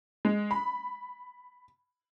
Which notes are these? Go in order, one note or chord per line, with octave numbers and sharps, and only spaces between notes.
G#3
B5